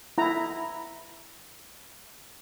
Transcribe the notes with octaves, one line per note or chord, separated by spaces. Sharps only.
E4 A#5